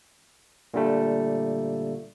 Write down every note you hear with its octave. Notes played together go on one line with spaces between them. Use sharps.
A#2 D3 G3 A3